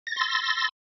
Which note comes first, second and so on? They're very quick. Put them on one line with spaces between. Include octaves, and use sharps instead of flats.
A#6 A6 C6 E6